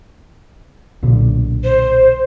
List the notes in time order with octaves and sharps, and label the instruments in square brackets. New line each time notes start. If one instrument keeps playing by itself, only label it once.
[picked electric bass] B1 A#2 D3
[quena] C5